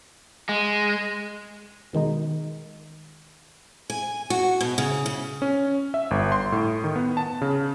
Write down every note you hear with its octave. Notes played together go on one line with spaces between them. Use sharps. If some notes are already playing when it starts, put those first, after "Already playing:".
G#3
B2 D#3 G#3 D#4
G#5
F#4
B2
C#3
C#3
C#4
E5
G1
C6
A2
D#3
B3
A5
C#3